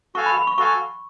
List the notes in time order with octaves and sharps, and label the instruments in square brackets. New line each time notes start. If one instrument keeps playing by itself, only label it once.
[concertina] F#4 A4 F5 G#5 [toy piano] C#6
[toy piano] B5
B5
C#6
[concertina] F#4 A4 F5 G#5 [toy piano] C#6